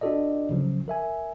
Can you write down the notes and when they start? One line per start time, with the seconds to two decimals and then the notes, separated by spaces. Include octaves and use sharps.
0.01 D4 F4 F#4 A4 D5 D#5
0.51 C#3 F3 F#3
0.88 A#4 E5 G#5